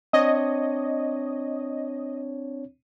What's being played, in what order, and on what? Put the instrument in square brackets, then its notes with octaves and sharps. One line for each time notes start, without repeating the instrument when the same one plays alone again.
[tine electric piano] C4 D4 C#5 [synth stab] D#5